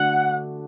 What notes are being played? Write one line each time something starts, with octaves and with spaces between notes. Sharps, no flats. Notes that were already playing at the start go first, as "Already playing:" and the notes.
Already playing: D3 A3 D4 F#4 F#5